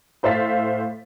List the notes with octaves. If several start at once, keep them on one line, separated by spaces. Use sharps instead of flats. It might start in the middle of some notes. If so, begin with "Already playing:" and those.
A2 C5 E5 F5 A6 B6